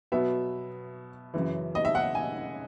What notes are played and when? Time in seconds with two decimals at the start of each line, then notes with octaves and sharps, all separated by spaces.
0.12 B2 F#3 B3 E5
1.34 F#2 C#3 E3
1.75 D#5
1.85 E5
1.95 F#5
2.15 G#5